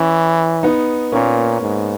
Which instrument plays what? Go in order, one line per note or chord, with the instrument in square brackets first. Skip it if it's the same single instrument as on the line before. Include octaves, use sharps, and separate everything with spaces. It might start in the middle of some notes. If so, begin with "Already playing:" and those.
Already playing: [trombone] E3 [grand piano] C#4 E4
[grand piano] B3 D#4
[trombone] A#2 [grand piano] A#3 C#4
[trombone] G#2